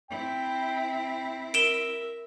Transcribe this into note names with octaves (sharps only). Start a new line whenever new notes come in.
C4 E4 G5
A#4 E5 D7 E7 G7